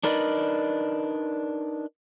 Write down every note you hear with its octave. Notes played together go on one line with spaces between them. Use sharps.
D4 D#4 A#4 B4 D5 D#5